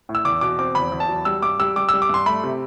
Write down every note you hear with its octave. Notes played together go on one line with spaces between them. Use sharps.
A2
E6
E2 D6
B2 D6
C4 D6
E2 B5
E2
A5
F#3
G3 E6
G2 D6
G3 E6
G3 D6
E6
G3
D6
G2 C6
A3 B5
C3